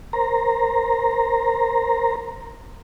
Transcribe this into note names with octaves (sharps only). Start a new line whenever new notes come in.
A#4 C5 A#5